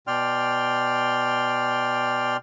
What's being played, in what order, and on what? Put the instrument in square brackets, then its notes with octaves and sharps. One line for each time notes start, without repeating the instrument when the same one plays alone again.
[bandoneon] B2 D5 G5 C6 F6